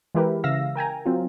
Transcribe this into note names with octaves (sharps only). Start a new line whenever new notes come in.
E3 G#3 E4 G4 A#4 B4
C#3 E5 F5 E6 A#6
A#4 G5 G#5 A#5
F#3 C4 F4